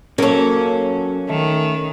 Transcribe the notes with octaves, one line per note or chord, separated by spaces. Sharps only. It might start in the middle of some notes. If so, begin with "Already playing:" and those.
F#2 F#3 A#3 C#4 A4 C#5
D#3 A3